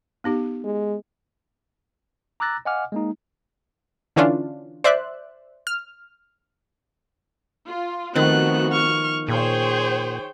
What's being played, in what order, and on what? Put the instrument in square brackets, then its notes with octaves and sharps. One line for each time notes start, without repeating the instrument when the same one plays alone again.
[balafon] B3 D#4 G4
[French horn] G#3
[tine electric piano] A#5 D6 E6 F#6 A6 A#6
D#5 F5 F#5 G#5 D6 F6
G#3 A#3 D#4
[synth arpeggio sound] D3 E3 C#4 D4 F4
C5 D5 E5 F#6
F6
[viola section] F4
[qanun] D#3 F3 [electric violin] A3 F#6 [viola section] B3 F#4 [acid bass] C4
[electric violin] C#6 F6
[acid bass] A#2 [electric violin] G#4 [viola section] C5 C#5 G5